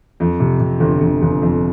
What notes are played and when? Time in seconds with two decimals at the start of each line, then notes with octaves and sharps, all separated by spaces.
0.20 F2
0.40 C3
0.60 C3
0.80 G1
1.01 G1
1.22 G1
1.42 F2